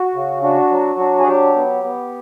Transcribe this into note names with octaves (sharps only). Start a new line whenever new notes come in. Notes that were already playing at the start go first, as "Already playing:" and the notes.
Already playing: F#4
C#3
D4 F#4
F#3
D4
G#4
F#3 G4
B3
B3